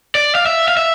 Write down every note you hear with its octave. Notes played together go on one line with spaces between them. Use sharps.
D5
F5
E5
F5
E5